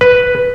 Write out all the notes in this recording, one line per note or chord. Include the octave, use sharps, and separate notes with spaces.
B4